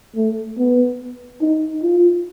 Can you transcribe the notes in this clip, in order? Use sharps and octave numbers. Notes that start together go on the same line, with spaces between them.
A3
B3
D#4
F4